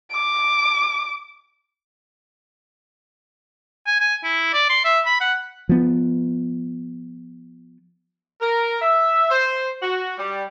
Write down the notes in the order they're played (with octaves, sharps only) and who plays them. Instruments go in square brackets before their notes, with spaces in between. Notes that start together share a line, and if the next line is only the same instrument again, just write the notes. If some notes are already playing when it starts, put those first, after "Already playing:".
[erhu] D6
[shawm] G#5
G#5
E4
D5
C6
E5
B5
F#5
[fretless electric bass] F3 B3
[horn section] A#4
E5
C5
F#4
G3